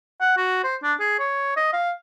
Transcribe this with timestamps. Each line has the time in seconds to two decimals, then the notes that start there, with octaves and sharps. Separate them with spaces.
0.21 F#5
0.37 F#4
0.64 C5
0.83 D4
1.00 G#4
1.19 C#5
1.57 D#5
1.73 F5